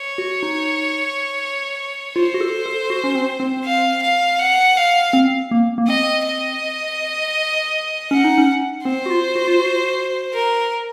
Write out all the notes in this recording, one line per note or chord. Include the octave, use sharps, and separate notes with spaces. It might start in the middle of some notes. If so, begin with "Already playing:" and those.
Already playing: C#5
F#4
D#4
F4 C5
F#4
A4
A4
F#4
C#4
C4
C4
F5
F5
F#5
F5
C4
A#3
A#3
C4 D#5
D#5
C#4 F#5
D#4
C#4
C4 C5
F#4
F4
F#4
F4
F#4
A#4